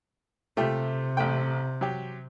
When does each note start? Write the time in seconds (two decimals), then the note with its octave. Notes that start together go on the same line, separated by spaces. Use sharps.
0.57 C3 A3 F4 G4
1.17 A1 A3 G5
1.81 F#3 G4